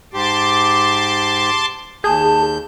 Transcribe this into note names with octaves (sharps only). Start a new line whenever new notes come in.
G#2 G4 A5 C6 D6
D#2 G#4 A5 G6